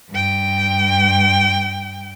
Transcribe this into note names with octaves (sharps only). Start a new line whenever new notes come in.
G2 G5